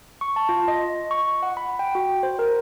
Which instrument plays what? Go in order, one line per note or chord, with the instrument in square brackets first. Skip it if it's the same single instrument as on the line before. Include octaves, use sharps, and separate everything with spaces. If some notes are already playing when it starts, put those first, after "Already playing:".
[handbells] C#6
A5
F4
D#5
C#6
F#5
B5
G5
F#4
C5
A#4